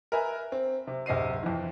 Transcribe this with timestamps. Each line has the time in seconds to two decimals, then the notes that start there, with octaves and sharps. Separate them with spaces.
0.12 A#4 B4 E5 G#5
0.52 C4
0.87 C3
1.06 D1 C3 D#5 C7 D#7
1.43 F2 E3